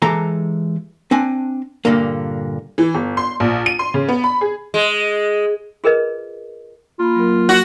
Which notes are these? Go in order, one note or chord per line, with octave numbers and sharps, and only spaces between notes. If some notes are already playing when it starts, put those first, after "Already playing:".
E3 G#3 G4 A4 A5 A#5
C4 D4 G#5 A5
G2 A#2 D3 A#3
E3
G1
C6
A#1
D#7
C6
C#3
B3
B5
G#4
G#3
F4 G#4 A#4 B4 D#5
A#3 F4 B5
F#3 A#3 A#4
F#4